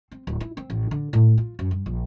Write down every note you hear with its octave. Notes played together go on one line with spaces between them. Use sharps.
C4
D1
E4
C4
A1
D3
A2
F4
F#2
G2
A#1